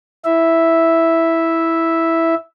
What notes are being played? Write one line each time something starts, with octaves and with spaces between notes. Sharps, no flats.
E4 E5